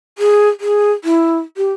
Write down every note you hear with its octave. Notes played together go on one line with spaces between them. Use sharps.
G#4
G#4
E4
G4